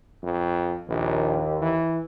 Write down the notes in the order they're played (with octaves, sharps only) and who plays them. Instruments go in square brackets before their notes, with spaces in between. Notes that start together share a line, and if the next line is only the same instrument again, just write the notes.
[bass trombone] F2
[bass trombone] A#1 [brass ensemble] D#2
[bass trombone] E3